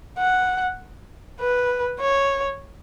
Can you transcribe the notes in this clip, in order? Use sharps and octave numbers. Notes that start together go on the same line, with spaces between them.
F#5
B4
C#5